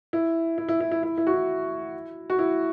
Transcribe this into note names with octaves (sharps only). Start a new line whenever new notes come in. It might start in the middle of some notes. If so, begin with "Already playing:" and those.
E4
E4
E4
E4
E4
E4
E4
F#4
E4
F#4
E4